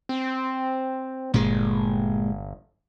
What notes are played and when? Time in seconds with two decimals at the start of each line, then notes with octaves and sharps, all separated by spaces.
0.09 C4
1.34 G1 A#2 G#3